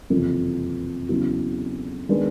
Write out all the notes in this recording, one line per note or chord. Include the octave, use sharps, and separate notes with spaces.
F#1 F2 C3 E3
E2 C#3 F#3
D#3 G#3 B3 D4